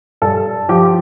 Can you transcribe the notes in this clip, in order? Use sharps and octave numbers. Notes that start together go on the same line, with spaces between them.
G2 A4
F3 G4